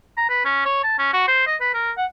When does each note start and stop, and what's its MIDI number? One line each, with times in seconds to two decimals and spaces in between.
0.17 0.26 82
0.30 0.42 71
0.45 0.61 61
0.66 0.82 73
0.84 0.98 81
0.99 1.13 61
1.13 1.23 66
1.28 1.45 72
1.47 1.56 75
1.61 1.73 71
1.74 1.91 70
1.98 2.06 78